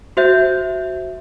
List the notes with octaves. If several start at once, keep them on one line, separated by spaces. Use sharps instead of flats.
F#4 C5 E5 G6